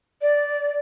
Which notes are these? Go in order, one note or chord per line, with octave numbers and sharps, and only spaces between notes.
D5